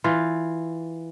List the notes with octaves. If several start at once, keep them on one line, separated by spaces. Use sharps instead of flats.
E3 F4